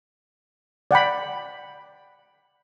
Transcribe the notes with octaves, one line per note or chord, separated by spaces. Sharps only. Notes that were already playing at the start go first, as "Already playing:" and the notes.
D5 F#5 G5 B5